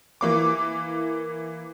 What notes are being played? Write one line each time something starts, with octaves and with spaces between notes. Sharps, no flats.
E3 A#3 D6